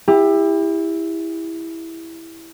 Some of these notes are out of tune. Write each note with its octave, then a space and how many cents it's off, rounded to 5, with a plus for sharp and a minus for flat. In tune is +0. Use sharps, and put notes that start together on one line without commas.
E4 +0 G4 +35